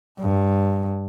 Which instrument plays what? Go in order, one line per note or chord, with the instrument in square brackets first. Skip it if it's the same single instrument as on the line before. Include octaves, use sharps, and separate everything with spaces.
[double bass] G2